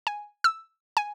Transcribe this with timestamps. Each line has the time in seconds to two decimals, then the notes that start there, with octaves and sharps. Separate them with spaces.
0.07 G#5
0.44 E6
0.97 G#5